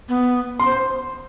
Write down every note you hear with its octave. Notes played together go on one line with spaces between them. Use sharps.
B3
C6
C5